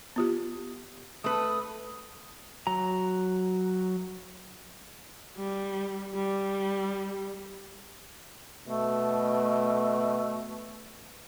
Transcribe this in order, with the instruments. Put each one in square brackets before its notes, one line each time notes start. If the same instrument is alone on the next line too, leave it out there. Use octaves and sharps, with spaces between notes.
[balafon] B3 F4 G4
[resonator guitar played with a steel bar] A3 B4 [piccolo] D#6
[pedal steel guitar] F#3 A#5
[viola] G3
G3
[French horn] B2 [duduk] A3